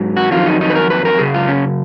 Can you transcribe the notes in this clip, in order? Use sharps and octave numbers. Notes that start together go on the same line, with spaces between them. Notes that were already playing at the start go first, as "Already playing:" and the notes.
Already playing: G#2 F#3
F#4
F2 D#3 F#3 F4
D#4
D#4
B4
A#4
B4
A#4
F#2 C#3 G#4
F4
C#4